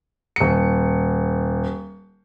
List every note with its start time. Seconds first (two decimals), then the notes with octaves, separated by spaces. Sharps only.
0.36 D#1 C#7